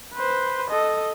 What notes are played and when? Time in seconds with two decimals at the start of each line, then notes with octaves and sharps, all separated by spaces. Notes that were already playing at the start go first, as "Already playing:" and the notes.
0.14 B4 C5
0.70 A4 D#5